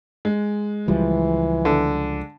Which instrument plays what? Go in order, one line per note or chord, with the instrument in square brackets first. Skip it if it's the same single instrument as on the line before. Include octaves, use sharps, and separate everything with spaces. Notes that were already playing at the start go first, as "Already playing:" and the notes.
[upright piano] G#3
[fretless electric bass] C#2 F3 G3 [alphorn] E3
[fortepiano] D3